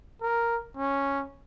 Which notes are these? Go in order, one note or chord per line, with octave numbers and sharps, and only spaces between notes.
A#4
C#4